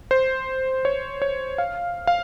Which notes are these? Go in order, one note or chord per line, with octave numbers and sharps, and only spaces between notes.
C5
C#5
C#5
F5
F5